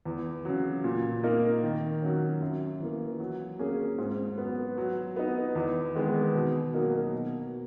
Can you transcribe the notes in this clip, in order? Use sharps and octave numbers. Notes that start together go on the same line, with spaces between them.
E2
C#3 F#3
A#2
A#3 D#4 A#4
D#3
F#3 C#4
F#2
E3 A#3
F#3
A#3 C#4 G#4
G#2
F#3 B3
F#3
B3 D#4
E2
D#3 G#3 B3
B2
F#3 A#3 D#4 A#4
B2